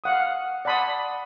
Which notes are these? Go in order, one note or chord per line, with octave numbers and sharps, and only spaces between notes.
F5 F#5 D#6
D5 F#5 A5 B5 C6 D#6